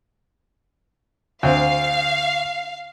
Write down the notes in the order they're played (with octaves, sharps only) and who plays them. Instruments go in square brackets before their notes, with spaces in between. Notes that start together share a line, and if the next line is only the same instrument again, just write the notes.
[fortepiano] D2 C4 [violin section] F5